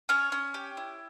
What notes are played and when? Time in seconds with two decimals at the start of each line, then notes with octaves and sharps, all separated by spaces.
0.09 C#4 C#5
0.32 C#4
0.54 G4
0.77 E4